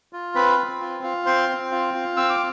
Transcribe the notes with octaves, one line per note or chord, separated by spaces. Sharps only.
F4
C4 B4 B5
C4
F4
F4
C4 C5 C6
C4
F4
F4
C4 E6
D6